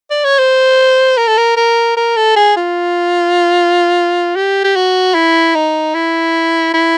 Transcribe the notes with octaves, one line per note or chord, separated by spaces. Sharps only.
D5
C#5
C5
A#4
A4
A#4
A#4
A#4
A4
G#4
F4
G4
G4
F#4
E4
D#4
E4
E4